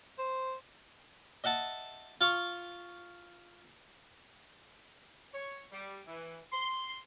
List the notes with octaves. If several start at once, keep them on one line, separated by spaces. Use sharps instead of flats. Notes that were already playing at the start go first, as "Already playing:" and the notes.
C5
D#5 E5 F#5 A5
F4 F5 C#6
C#5
G3
E3
C6